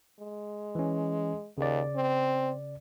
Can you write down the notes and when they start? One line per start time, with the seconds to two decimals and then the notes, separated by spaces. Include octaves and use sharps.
0.20 G#3
0.75 E3 C#4
1.58 D#2 C#3 D5
1.96 C4